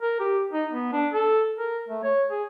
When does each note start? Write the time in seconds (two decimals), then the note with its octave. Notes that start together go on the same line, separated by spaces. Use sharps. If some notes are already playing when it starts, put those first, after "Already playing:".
0.02 A#4
0.20 G4
0.53 D#4
0.71 B3
0.92 D4
1.13 A4
1.59 A#4
1.89 A3
2.03 C#5
2.31 G#4